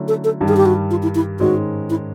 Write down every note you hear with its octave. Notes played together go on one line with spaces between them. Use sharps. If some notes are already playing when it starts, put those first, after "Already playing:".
Already playing: D3 F#3 A3 C#4 E4
A4
A4
G2 D#3 G3
G#4
G4
F#4
F4
E4
E4
G#2 D#3 G#3 C#4 F#4
E4